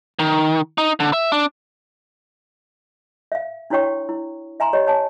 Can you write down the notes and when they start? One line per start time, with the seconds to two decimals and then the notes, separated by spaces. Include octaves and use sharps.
0.19 D#3
0.78 D#4
1.00 D3
1.13 E5
1.32 D4
3.32 E5 F5
3.70 D4 E4 F#4 C#5 G5 C#6
4.09 E4
4.60 E5 G#5 A#5 C6
4.73 G4 C#5 D#5
4.87 C#5 G#5 A5